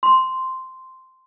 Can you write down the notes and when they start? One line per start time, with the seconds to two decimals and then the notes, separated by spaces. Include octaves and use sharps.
0.03 C6